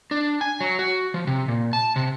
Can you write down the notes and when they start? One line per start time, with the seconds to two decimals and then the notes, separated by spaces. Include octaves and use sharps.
0.11 D4
0.41 G#5
0.61 F#3
0.79 F#4
1.14 F3
1.27 C3
1.48 A#2
1.73 A5
1.96 C3